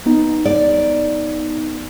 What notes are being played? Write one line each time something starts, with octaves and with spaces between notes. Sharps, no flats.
B3 D#4
D5